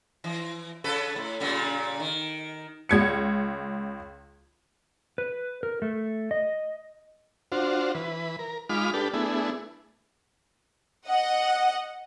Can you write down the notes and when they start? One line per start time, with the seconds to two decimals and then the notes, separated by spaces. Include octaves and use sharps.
0.24 E3
0.84 C#3 A4 B4
1.16 A2
1.40 A#2 C#3 G3
2.00 D#3
2.89 C#2 G#6 C#7
5.18 B4
5.63 A#4
5.82 A3
6.31 D#5
7.52 D4 F4 F#4 C5
7.94 E3 B4
8.39 A#4
8.69 G#3 D#4 F4 B5 D6 F6
8.94 D4 G4 A4 B4
9.14 A3 B3 D4 E4 G#4
11.07 D#5 F#5